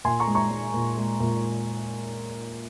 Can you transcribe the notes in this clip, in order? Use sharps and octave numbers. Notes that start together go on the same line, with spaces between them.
A#2 G#5 C6
A#5 C#6
G#3
A#5 C#6
G#3
A#2
G#3
A#2